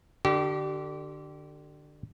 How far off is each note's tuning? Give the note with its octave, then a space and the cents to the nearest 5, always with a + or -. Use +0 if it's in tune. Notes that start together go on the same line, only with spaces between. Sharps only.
D3 +20 G4 -30